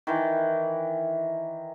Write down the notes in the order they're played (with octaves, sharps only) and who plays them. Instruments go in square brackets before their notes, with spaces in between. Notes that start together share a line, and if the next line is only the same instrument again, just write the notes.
[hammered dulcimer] D#3 E3